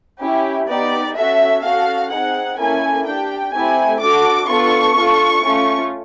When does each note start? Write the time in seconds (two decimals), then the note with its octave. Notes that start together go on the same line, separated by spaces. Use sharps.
0.21 C#4 E4 G4
0.68 B3 D#4 G4 D5
1.15 C#4 F#4 A4 E5
1.63 C#4 F#4 A4 F5
2.10 C4 D#4 G#4 F#5
2.57 A#3 C#4 E4 A4 G#5
3.05 D4 G4 G5
3.53 A3 C4 E4 G4 G#5
4.00 D4 F#4 A4 D6
4.48 B3 D4 F4 A4 C#6
4.95 D4 F4 A4
5.43 A3 C#4 F4